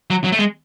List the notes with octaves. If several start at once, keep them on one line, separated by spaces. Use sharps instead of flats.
F#3
F#3
A3
G#3